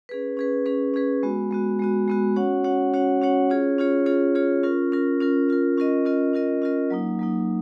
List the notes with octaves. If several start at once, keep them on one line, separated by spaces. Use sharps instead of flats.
C#4 G#4 B4
C#4 G#4 B4
C#4 G#4 B4
C#4 G#4 B4
G#3 B3 F#4
G#3 B3 F#4
G#3 B3 F#4
G#3 B3 F#4
C#4 F#4 C#5 F#5
C#4 F#4 C#5 F#5
C#4 F#4 C#5 F#5
C#4 F#4 C#5 F#5
C#4 F4 G#4 C#5
C#4 F4 G#4 C#5
C#4 F4 G#4 C#5
C#4 F4 G#4 C#5
C#4 F4 A#4
C#4 F4 A#4
C#4 F4 A#4
C#4 F4 A#4
C#4 F4 A#4 D#5
C#4 F4 A#4 D#5
C#4 F4 A#4 D#5
C#4 F4 A#4 D#5
F#3 A#3 D#4
F#3 A#3 D#4